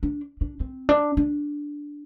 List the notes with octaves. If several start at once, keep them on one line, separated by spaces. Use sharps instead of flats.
D4
D4
C4
D4
D4